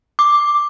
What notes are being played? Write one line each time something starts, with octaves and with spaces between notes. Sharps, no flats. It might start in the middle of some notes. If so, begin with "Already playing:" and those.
D6